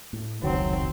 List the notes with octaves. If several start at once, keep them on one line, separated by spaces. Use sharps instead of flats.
A2
F1 C#2 D#3 F#3 C4